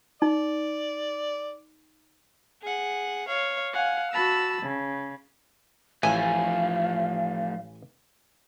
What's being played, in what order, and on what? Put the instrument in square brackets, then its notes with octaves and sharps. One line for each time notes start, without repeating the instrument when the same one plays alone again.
[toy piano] D#4 [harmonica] D5
[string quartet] G#4 F#5
C#5 F5
F5 F#5 G#5
F#4 A5 B5 E6
C#3
[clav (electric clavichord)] A1 A2 E5 [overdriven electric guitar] F3 A3 [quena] F5 [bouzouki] G#5